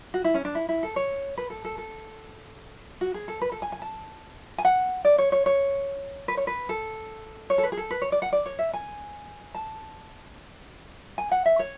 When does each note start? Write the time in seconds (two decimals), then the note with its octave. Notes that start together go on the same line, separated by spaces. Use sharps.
0.14 F#4
0.24 E4
0.34 C#4
0.45 D4
0.55 E4
0.69 E4
0.83 A4
0.96 C#5
1.37 B4
1.50 A4
1.65 A4
1.78 A4
3.01 F#4
3.14 G#4
3.28 A4
3.41 B4
3.52 A4
3.62 G#5
3.72 G#5
3.82 A5
4.58 G#5
4.65 F#5
5.05 D5
5.18 C#5
5.32 C#5
5.46 C#5
6.28 B4
6.37 C#5
6.47 B4
6.69 A4
7.50 C#5
7.58 A4
7.63 B4
7.72 G#4
7.77 A4
7.91 B4
8.02 C#5
8.12 D5
8.22 F#5
8.33 D5
8.46 C#5
8.59 E5
8.74 G#5
9.55 A5
11.18 G#5
11.31 F#5
11.46 E5
11.59 C#5